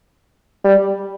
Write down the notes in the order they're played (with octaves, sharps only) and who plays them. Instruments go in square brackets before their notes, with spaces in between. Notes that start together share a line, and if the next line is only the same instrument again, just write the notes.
[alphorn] G3